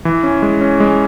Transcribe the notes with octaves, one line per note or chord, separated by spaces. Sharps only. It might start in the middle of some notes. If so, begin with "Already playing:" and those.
E3
C#4
G#3
C#4
G#3